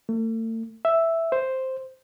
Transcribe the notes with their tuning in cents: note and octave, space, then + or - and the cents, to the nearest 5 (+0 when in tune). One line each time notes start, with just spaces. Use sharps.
A3 +40
E5 +0
C5 +0